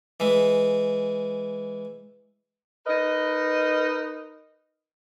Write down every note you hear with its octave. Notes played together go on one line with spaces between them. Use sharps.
E3 G#3
D#4 A#4 B4 D#5